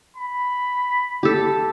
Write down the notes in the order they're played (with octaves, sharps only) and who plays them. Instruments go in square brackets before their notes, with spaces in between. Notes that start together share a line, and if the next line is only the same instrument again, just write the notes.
[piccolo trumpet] B5
[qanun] G4 A4